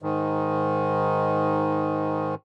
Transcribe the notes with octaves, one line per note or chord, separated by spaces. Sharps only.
G#2 D#3